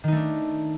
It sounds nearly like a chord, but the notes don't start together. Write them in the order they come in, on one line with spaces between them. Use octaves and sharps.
D#3 D#4 A3 D4